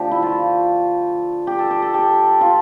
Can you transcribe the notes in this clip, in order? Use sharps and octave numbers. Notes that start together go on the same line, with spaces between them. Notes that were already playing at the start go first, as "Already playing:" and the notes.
Already playing: D3 F3 A3 G4
E4
F4
G4
A4
G4
A4
G4
F4